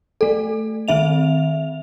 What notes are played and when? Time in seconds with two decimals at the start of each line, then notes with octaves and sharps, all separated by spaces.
0.21 A3 A4
0.88 D#3 C4 E5 F7